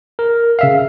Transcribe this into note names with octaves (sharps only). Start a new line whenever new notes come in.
A#4
C#3 E5 F5